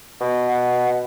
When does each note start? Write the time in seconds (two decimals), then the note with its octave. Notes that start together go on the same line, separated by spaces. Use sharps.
0.20 B2
0.49 F#5